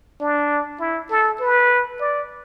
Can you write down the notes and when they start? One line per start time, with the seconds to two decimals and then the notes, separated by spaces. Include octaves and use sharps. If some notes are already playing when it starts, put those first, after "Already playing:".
0.21 D4
0.80 E4
1.10 A4
1.41 B4
2.01 D5